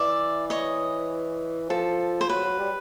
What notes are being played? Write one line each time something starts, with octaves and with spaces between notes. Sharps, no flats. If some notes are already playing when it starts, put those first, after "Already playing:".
Already playing: E3 D5 E5
C#5 D#5
F3 A4
C5
F#3 B4
F#3
G3